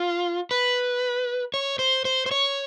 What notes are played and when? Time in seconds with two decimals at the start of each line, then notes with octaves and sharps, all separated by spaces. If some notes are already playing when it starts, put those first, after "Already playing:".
Already playing: F4
0.51 B4
1.54 C#5
1.79 C5
2.05 C5
2.26 C5
2.31 C#5